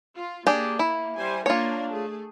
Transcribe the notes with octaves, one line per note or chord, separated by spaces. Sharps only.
F4
A#3 D4 G4 G#4
E4
G3 C5 G#5
A#3 D4 F4 A#4 C#5
A3 G#4